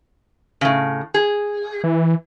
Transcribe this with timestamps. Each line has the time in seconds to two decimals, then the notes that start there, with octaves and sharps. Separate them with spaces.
0.61 A2 C#3
1.14 G#4
1.84 E3